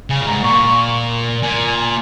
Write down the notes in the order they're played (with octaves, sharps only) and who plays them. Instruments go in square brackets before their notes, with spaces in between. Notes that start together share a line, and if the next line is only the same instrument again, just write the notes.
[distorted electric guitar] C#3 [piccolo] G#5
[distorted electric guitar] A#2
[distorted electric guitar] G#2 [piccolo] A#5
[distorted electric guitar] A#2 [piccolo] C#6
[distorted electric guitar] A#2 [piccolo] G#5